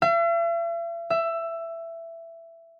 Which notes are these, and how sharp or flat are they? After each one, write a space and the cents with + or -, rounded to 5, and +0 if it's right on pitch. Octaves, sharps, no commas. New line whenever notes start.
E5 +45
E5 +15